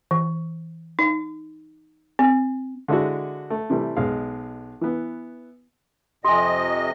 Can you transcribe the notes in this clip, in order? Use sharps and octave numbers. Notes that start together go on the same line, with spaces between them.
E3
D#4
C4
D3 G#3 D4 E4 F#4
A3
C3 E3 G3 A3
B1 G#3 F5
E3 B3
F2 C3 G4 D#5 G#5